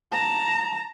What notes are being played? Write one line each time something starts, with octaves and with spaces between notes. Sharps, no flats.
A5 A#5